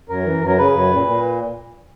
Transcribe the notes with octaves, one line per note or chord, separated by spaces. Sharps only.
F#2 A#4
E3
F#2
A#4
C#3 B4
F#2
A#2
A#2